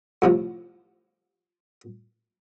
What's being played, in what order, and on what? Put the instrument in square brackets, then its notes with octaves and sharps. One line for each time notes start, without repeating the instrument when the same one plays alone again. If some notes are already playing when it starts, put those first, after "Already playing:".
[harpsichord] A2 C3 F3